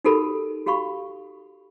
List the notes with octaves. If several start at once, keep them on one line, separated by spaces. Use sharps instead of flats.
D#4 F#4 G4 A4 A#4 B5
F#4 G4 F5 B5 C#6